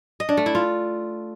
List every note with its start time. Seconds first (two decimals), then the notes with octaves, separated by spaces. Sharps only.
0.20 D#5
0.29 D4
0.37 A3
0.46 E4
0.55 F4